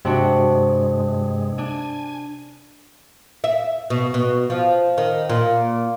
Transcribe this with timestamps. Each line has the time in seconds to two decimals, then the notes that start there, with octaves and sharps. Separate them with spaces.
0.05 G2 C3 G#3 D4 F#4
1.58 D4 G#5
3.44 E5
3.90 B2
4.14 B2
4.50 F3
4.98 D#3
5.29 A#2